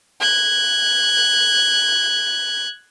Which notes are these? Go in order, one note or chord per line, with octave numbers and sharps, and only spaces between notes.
F#6 G#6